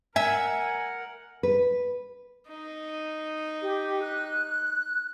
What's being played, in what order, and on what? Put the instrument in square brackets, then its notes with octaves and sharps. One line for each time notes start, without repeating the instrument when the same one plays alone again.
[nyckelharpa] A#4 F#5 [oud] E5 [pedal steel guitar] G#5
[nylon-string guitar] B4
[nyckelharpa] D#4
[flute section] G4
F#6